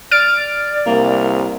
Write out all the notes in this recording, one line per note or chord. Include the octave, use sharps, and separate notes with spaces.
D5 F6 A6 D7
C2 A#3